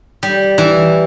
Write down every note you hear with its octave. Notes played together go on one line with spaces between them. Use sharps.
G3
E3